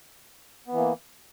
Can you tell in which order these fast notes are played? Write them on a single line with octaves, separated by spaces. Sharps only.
B3 E3 A#3